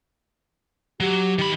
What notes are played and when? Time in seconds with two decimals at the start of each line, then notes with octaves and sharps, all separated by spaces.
1.00 F#3 G4
1.39 D#3 B5